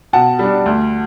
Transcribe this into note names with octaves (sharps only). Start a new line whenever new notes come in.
B2 F#5 A5
G3 D4
D2